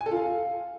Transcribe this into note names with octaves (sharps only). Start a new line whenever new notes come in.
G#5
A4
F4
F5